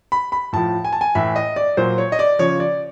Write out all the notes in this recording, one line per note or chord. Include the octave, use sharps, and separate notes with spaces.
B5
B5
A2 F3 A5
G#5
A5
G#5
A2 E3 E5
D#5
D5
A#2 F#3 C5
C#5
D#5
D5
C#3 F3 C#5
D5